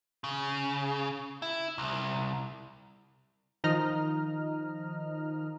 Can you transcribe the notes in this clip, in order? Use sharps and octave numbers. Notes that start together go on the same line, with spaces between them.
C#3
E4
C2
D#3 F3 D#4 D#5 A#5 F6